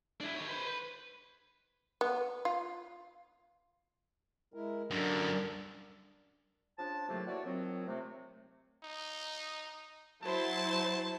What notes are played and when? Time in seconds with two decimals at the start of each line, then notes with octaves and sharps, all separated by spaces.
0.21 D4 E4
0.36 D#3 C#5
0.49 B4 C5
0.67 B4
2.01 B3
2.45 F4
4.54 G#3 E4 A#4
4.91 F#2 D3 D4 A#4
6.78 C#3 F3 D4 A5
7.09 A2 C3 D#3 F#3 A3 A#3
7.28 E4 F#4 C#5 D5
7.44 D#3 F3 F#3 C4
7.87 C3 A3
8.84 D#4
10.23 F#3 E4 C5 A5